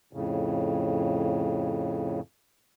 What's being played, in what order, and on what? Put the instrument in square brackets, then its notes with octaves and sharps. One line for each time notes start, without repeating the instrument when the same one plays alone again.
[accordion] F2 A2 C#3